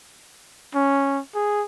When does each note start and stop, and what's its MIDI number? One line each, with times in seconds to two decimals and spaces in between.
0.75 1.20 61
1.35 1.65 68